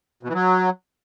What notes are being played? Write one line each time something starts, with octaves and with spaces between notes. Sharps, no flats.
B2
E3
F#3